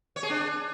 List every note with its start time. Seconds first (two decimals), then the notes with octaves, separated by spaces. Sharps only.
0.16 C#5
0.23 G#4
0.30 D4